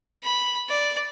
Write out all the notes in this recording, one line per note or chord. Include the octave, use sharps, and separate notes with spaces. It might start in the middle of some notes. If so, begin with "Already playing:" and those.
B5
D5